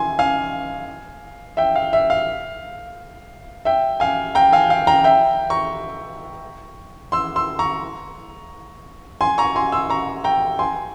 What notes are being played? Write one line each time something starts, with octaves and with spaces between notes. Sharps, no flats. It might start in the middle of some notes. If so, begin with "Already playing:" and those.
Already playing: G#5 C6
F5 G#5
E5 G5
F5
E5
F5
E5 G5
F5 G#5
G5 A#5
F5 G#5
F5
G5 A#5
E5 G5
A#5 C#6
C6 E6
C6 E6
A#5 C#6
G#5 C6
A#5 C#6
G#5 C6
C6 E6
A#5 C#6
G5 A#5
G#5 C6